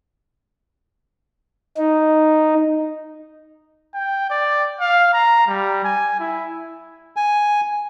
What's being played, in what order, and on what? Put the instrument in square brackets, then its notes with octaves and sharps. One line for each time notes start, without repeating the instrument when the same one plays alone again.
[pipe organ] D#4
[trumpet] G5
D5
F5
A#5
G3
G#5
E4
[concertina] G#5